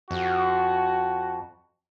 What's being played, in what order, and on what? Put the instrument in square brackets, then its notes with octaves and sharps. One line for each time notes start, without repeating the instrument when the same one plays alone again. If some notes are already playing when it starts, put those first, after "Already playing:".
[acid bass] F2 [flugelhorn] F#4